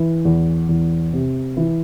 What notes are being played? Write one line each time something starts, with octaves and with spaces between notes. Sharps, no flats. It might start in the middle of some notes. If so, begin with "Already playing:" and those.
Already playing: E3
E2
E2
C3
E3